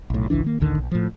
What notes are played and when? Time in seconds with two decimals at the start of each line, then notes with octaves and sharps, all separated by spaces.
0.10 B1 A2
0.30 G#1 C#2 E3 D4
0.44 D#3 A#3
0.60 A1 D2 D3 D#3
0.78 B1
0.91 A2 F3